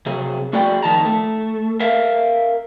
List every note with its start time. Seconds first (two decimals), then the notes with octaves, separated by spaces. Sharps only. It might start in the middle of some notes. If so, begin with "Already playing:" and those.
0.06 C3 F#3 G#4
0.53 A3 F#4 G#4 D5 G5
0.82 F2 D#3 A5 A#5
1.05 A3
1.80 A#4 E5 F5